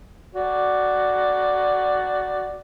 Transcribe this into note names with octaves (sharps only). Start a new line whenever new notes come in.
F#4 D5